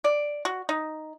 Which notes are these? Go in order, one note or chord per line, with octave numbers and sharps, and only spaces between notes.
D5
F#4
D#4